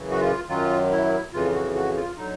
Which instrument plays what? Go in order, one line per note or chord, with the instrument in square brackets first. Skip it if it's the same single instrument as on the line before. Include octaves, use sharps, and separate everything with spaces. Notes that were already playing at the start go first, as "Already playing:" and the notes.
Already playing: [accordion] F#2 C#3 E3
F#4
F4
F#2 D#3 F#3 F4
E4
F2 C#3 E3 F4
F#4
F#4
F4
D3 F#3 D#4